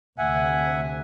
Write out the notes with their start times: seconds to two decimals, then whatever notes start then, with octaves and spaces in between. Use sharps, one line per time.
0.18 D2 C3 E5 F#5 G#5